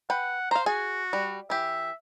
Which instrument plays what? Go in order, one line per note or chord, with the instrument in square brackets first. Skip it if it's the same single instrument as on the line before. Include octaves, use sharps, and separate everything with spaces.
[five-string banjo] B4 G5 [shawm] F#5
[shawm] C5 [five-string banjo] F5 A#5
[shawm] F#4 [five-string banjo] G#4 G#5
[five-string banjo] G3
[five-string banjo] E3 G4 [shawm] E5